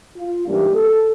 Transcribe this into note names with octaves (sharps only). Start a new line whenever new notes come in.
F4
G#2 E3 G3 A#3 D4 G4
A4